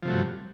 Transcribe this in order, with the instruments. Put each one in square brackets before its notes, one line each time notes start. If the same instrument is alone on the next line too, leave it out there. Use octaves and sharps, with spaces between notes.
[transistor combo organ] F3
C3
A3
F#3
G2